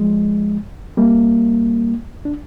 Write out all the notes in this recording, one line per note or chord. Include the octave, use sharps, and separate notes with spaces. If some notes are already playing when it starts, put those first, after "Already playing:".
Already playing: F3 G#3
G3 A#3
D4